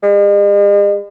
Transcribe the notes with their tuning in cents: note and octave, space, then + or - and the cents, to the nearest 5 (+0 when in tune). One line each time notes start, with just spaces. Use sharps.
G#3 -45